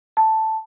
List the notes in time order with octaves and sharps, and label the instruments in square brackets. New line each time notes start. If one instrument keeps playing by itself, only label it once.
[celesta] A5